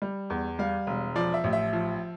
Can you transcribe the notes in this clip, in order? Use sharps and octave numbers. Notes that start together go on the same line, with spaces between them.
G3
E2
G3 F5
E1
F3 D5
E5
A1
E5
F3